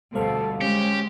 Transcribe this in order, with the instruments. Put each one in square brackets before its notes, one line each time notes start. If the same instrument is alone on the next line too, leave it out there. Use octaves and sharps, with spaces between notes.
[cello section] D2 B2 [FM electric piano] G3 C5 F5 [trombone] A4
[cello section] G#3 [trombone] C#4 [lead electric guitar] G4